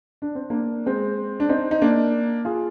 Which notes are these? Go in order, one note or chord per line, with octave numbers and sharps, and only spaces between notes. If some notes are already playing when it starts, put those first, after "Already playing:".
D4
C4
A#3 D4
G#3 C4
D4
C4 D#4
D#4
A#3 D4
F4 G#4